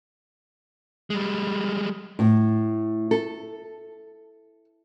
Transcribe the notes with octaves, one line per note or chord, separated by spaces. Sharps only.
G3 G#3
A2
A4